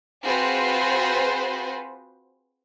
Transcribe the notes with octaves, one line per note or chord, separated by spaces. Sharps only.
C4 F4 F#4 G#4 B4 C5